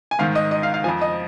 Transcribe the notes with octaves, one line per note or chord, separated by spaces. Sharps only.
G#5
G#2 D#3 F5
D#5
D#5
F5
F5
F2 F3 G#5
D#5